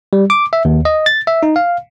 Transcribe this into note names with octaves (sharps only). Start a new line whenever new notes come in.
G3
D6
E5
D#2
D#5
A6
E5
D#4
F5